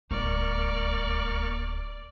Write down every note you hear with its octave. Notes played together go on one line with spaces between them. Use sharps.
D1 C#2 A#3 D5 C#6 F6